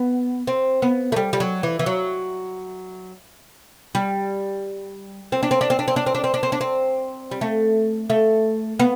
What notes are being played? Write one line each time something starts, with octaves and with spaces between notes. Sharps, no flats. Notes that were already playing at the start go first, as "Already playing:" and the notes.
Already playing: B3
C4
B3
A3
G3
G3
F#3
E3
E3
F#3
G3
C4
D4
C4
D4
C4
D4
C4
D4
C4
D4
C4
D4
C4
D4
C4
G3
A3
A3
B3